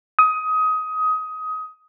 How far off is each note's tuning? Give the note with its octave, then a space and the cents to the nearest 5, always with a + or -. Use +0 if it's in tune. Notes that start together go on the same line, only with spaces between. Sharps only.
D#6 +20